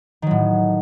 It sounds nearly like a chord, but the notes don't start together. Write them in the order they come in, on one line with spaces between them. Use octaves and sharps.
D#3 F#3 A2